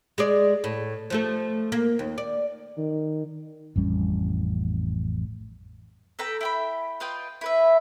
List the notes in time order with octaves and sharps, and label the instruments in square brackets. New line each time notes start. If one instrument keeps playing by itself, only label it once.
[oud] G#3 G#4 D5
A2
F3 A3 A4
A#3
D#2
D5
[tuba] D#3
[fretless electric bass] A1 F2 G3 C#4
[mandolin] A4 B4 G5 A#5
E4 G5 B5
F4 B4 D#5 G5
E4 B4 E5